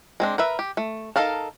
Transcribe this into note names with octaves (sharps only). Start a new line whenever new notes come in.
G#3 C4 D4
A#4 B4 E5
G4
A3
D#4 A4 A#4 F5 A5